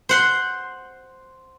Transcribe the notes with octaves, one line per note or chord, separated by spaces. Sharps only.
C5 F#5 C6